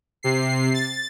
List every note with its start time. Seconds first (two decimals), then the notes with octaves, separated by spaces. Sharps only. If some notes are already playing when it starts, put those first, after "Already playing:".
0.23 C3 C7
0.74 A6